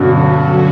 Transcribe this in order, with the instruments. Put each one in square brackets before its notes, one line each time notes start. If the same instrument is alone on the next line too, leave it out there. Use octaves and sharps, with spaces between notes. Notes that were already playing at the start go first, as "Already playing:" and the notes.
Already playing: [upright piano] G2 B2 [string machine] D3 F#3 C#4 F#4